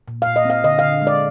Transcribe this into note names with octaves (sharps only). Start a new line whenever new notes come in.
A#2
F5
A#2
D#5
C4 F5
D3 D#5
F5
D3
G#3
D5